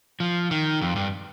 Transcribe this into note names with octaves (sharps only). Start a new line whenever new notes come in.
F3
D#3
F2
G2